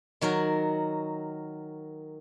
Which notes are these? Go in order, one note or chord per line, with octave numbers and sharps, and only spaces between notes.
D#3 F#3 F#4 A#4